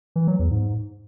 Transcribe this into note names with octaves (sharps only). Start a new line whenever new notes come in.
E3
F#3
E2
G#2